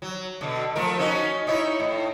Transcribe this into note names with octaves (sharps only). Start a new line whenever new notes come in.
F#3
B2 D3
F3 A3 A#4
C#4 D#4 F#4
D#4 E4 C#5
A2